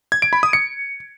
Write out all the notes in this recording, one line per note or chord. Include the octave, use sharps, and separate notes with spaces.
G#6
D7
B5
D#6
C#7